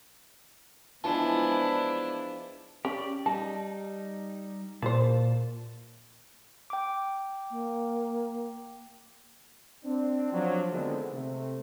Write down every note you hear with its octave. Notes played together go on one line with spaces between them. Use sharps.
E3 F3 G#3 B3 D4 E4 F4 A5
C#4 G4 D5
G3 D#4 A5
A#2 E3 C5 A5
G5 D6
A#3
C4 D4
F3 F#3 D4
D3 D#3 G#3 A3 B3 C4
C3 A3